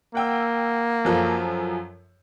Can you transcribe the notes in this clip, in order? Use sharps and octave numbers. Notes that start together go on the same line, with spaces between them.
A#3 F#5 G5 E6
F#2 F3 A4